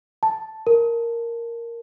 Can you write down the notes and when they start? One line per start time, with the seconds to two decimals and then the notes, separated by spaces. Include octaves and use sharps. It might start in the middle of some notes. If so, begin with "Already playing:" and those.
0.23 A5
0.67 A#4